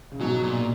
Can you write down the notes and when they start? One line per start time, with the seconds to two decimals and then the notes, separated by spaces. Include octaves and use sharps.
0.12 C#3
0.20 G#2 B2 F#3
0.43 A#2